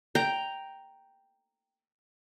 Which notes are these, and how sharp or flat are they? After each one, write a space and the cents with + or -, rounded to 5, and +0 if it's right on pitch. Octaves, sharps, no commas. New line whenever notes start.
G5 +0 A#5 +0